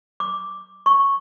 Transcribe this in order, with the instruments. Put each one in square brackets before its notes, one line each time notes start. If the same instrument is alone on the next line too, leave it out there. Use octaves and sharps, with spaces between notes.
[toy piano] D6
C#6